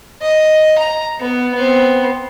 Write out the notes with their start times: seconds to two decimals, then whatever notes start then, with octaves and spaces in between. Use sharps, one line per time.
0.21 D#5
0.78 A#5
1.20 B3
1.55 B3 C4